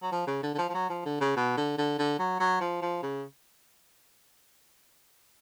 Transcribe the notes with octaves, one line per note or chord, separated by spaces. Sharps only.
F#3
F3
C#3
D3
D3
F3
F3
F#3
F3
D3
C#3
B2
D3
D3
D3
F#3
F#3
F3
F3
C#3